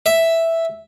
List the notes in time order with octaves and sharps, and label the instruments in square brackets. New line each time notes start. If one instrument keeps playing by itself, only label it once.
[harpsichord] E5